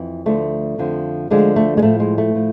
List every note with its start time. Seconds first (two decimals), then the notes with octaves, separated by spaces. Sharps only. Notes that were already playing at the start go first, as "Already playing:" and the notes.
Already playing: F2 E3
0.26 D2 D3 F3 A3
0.78 F2 D3 F3
1.30 D2 D3 F3 G#3
1.56 A3
1.77 G#3
1.82 A2 F3 A3
2.00 G#3
2.18 A3
2.35 A2 F3